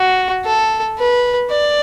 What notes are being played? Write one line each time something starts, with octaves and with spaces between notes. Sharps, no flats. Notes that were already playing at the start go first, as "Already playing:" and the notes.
Already playing: F#4
A4
B4
D5